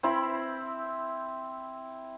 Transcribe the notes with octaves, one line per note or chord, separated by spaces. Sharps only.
C4 E4 B5